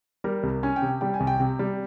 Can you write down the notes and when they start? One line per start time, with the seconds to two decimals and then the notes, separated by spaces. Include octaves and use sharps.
0.24 G3 A#4
0.43 C2
0.63 C#4 G#5
0.76 G5
0.82 C3
1.01 G3 G5
1.14 G#5
1.20 C2
1.27 G5
1.40 C3
1.59 G3